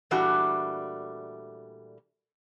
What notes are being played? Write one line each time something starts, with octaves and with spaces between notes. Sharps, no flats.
A#2 E3 G3 A3 D4 F#4